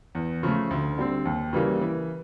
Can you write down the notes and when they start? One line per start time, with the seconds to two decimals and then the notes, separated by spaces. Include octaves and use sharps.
0.15 E2
0.43 C#3 F3 A3
0.71 D2
0.98 D3 G3 C4
1.25 D#2
1.53 C#3 E3 G3 A#3
1.81 E3